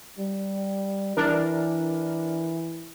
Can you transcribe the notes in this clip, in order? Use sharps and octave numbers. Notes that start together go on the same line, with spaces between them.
G3
E3 D4 A#4